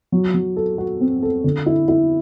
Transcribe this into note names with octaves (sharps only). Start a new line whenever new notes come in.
F#3
F#3
A4
F#4
C4
A4
D3
E4
E4